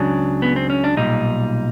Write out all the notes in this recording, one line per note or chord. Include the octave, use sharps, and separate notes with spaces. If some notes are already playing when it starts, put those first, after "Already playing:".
Already playing: C#2 C#3 F#3 D4
B3
C4
C#4
D4
B1 A#2 G3 D#4